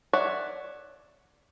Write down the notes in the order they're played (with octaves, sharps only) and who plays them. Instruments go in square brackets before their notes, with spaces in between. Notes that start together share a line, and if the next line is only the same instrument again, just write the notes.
[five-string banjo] C#5 D5 E5 F#5